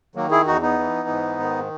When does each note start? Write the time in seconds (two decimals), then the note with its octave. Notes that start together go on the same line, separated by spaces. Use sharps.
0.15 D#3 F#3 A#3
0.31 E4 G#4
0.46 E2 D#4 F#4
0.62 B3 D#4
0.79 E3
1.09 G#2
1.40 D#3